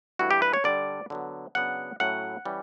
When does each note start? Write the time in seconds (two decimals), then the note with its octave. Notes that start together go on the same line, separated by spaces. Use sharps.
0.19 G2 E3 A3 E4 F#4
0.31 G4
0.42 B4
0.53 C#5
0.64 D3 G3 D4 D5
1.10 D3 F#3 B3
1.55 C#3 F#3 B3 D4 F#5
2.00 A2 F#3 C#4 E4 F#5
2.46 E3 G3 C#4